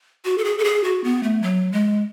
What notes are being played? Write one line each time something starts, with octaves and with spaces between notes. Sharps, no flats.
F#4
A4
G#4
A4
G#4
F#4
B3
A3
F#3
G#3